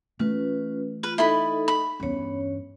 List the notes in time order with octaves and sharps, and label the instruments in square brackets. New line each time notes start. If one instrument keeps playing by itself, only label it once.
[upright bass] E3 A3 [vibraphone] C#4 F4 B4
[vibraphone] F4 [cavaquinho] B4
[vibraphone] D#4 A4 D#5 [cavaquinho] E4 B5
[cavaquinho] B5
[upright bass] E2 G2 [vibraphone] C#4 C#5